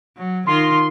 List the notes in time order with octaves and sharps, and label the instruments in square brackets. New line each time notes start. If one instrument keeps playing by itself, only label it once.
[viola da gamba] F#3
[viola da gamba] D#3 F4 [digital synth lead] C6